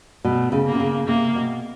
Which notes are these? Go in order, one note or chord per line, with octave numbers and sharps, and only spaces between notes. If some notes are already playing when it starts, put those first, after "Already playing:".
B2 A3
C#3
A#3
C3
C#3
C3 A#3
B2